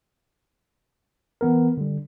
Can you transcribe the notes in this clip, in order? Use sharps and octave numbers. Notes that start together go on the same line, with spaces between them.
E3 B3 A#4
D3 G3